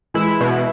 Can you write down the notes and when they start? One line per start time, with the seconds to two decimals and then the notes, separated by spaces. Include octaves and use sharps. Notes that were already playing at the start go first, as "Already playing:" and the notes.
0.14 E3 G#3 E4
0.41 B2